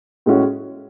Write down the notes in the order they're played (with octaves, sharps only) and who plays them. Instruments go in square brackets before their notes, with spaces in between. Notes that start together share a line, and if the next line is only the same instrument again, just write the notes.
[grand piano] A2 G#3 C#4 F#4